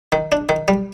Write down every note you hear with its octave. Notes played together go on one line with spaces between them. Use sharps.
D#3
D4
D#3
G3